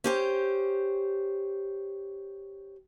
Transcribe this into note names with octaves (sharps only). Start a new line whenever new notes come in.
C#4 G4 C5